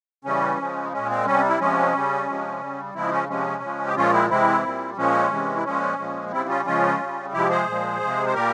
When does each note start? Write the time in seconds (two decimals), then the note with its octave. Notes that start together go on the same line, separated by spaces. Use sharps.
0.24 C#3 E3 G3 C#4
0.59 C#3 F3 G#3
0.92 A#2 G#3 C#4
1.10 C4
1.26 C3 G3 C#4
1.49 E4
1.59 C3 F3 G#3 C#4
1.94 C#3 G3
2.27 C3 F3 G#3
2.61 C#3 G3
2.94 C#3 F3 G#3 C4 E4
3.11 C#4
3.29 C3 F3 G#3 C#4
3.62 C#3 F3 G#3
3.86 G4
3.96 A#2 F3 G#3 C#4 F4
4.13 C4 E4
4.29 C3 E3 G#3 C4 E4
4.63 A#2 G3
4.97 A#2 F3 G#3 C#4
5.31 C3 E3 G#3
5.56 E4
5.64 A#2 F3 G#3 C#4
5.98 A#2 F3 G#3
6.32 C#3 G3 C4 E4
6.49 C#4 F4
6.65 C#3 F3 G#3 C#4 F4
7.00 C#3 G3
7.33 C3 F3 G#3 E4 G4
7.50 G#4 C5
7.67 A#2 F3 G#3
8.00 C3 F3 G#3
8.26 C5
8.34 A#2 G3 G4 A#4